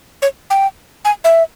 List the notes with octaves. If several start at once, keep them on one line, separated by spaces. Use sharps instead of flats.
C#5
G5
G#5
E5